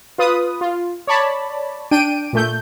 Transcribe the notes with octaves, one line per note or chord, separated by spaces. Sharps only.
F4 B4 D#6
F4
C#5 D5 A5 B5
D4 G5 D7 D#7
A#2 A3 G6